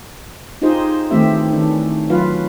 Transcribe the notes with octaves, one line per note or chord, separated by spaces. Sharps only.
D#4 F4 G4 G#4 C5 D#5
D#3 E3 A3 C4 G4 E5
D#3 E3 C#4 D4
F#3 F4 B4 F5